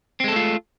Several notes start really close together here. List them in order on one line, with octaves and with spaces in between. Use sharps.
C4 G#3 A4 A3 F4